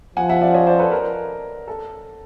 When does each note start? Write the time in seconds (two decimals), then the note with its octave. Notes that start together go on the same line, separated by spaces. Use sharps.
0.16 F3 F#5 G#5
0.29 E5 F#5
0.42 D5 E5
0.54 C#5 D#5
0.67 C5 D5
0.79 A4 B4
0.92 A#4
1.68 A4